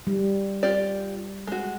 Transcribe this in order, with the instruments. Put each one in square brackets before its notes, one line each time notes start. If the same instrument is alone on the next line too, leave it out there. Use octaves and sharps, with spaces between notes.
[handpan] G3
[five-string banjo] F4 G4 D5
G#3 F#4